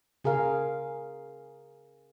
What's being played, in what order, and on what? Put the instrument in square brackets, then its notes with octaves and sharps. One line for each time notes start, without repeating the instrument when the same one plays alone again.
[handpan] C#3 G#4 A#4 F5